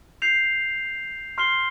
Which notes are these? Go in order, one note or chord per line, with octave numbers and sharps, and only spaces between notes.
G6 C7 F7
C6 F6 C7 G7